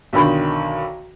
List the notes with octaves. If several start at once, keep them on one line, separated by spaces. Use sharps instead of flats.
B1 D3 D#3 B5